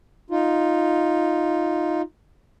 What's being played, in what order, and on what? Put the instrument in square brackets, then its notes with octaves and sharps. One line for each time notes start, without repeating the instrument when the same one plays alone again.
[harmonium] D#4 F4